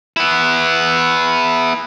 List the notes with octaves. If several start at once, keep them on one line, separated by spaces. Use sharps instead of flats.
B3 E4